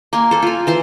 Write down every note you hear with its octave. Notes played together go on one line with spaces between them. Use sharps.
A#3 G#5 C6
A4 C5
F4 G#5
E3 C5 C6